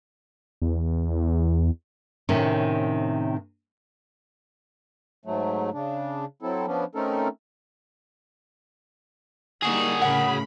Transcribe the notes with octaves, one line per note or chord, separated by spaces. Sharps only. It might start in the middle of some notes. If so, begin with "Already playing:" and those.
E2
A2 C3 D#3 C#4
G#2 F#3 A3
C#3 D4
F#3 C4 E4 A4
F3 B3 C#4 D4
A3 C4 C#4 D#4 A4 A#4
D3 G3 A#3 D#4 F#4 G#4
A2 C#3 A#4 F#5 B5